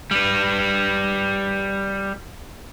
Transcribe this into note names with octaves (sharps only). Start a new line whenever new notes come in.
G3 B4